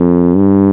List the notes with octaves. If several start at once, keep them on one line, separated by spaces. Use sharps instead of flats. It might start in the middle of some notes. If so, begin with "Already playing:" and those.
Already playing: F2
G2